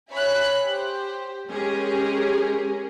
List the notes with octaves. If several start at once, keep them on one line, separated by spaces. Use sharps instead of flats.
C#5 E5 G#5 B5 F#6
G4 C5
G#3 C#4 G4 G#4 A#4